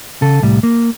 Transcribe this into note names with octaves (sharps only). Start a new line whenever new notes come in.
C#3 A4
C2 A2 G3
A#3